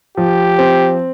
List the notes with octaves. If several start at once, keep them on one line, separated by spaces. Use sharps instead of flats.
F3 G4
C4